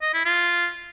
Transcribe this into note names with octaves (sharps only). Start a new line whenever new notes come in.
D#5
E4
F4